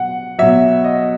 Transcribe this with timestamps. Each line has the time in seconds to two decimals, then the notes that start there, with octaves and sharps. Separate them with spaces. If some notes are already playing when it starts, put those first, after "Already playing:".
Already playing: B2 F#3 F#5
0.39 B2 F#3 E5
0.84 D#5